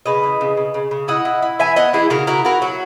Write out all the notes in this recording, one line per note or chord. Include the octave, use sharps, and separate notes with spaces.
C#3 B4 D#5
E3
C#3
C#3
C#3
C#3
E4 D#5 F#5
E4
E4
E3 E5 G#5
B3 D#5 F#5
E3 E4 G#4
C#3 F#4 A#4
E4 F#4 A#4
E4 F#4 A#4
F#3 F#4